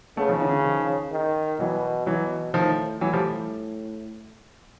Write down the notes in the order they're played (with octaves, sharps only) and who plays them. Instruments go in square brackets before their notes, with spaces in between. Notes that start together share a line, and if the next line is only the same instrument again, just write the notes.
[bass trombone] C#3 [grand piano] A3 B3
[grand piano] D#3 F3
D3 E3
D3 E3
D#3 F3
[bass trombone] D#3
[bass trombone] B2 [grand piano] E3 F#3
[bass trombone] B2 [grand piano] E3 F#3
[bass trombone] A2 [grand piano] D#3 F3
[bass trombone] A2 [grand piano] E3 F#3
[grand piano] F3 G3